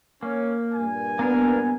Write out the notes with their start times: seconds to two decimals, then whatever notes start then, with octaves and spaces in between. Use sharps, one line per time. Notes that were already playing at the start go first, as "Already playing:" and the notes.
0.23 A#3 C#4
0.73 G2 A#2 G#5
1.19 A#3 B3 D4 A#4